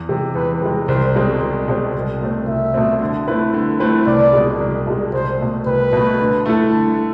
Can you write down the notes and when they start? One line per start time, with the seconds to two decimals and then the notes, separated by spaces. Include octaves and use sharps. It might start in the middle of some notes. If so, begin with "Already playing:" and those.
Already playing: E2
0.09 C3 G#3
0.35 E2 B4
0.62 C3 G#3
0.88 C2 C5
1.15 B2 G#3 C4
1.41 C2
1.68 B2 G#3 C4
1.94 C2
2.21 B2 A3 C4
2.48 C2 E5
2.74 B2 A3 C4
3.00 D3
3.27 A3 C4 E4 B4
3.54 D3
3.80 A3 C4 E4 B4
4.07 C2 D5
4.33 B2 G#3
4.60 C2
4.87 B2 G#3
5.13 C2 C5
5.40 B2 A3
5.66 C2 B4
5.93 B2 A3
6.20 D3
6.46 A3 E4 A4
6.73 D3